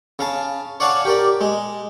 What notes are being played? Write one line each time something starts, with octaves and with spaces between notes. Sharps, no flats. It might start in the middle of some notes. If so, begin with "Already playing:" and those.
C#3 F5 A5
C#5 D5 F5 F#5 G#5 A5
G4 A#4 D5
G#3